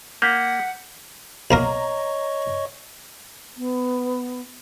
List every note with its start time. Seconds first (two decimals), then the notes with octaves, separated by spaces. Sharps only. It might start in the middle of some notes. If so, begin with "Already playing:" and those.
0.22 A#3 F#5 G6 B6
1.51 B1 A#3 A#4 C#5 D#5 A#5 C#6
3.57 B3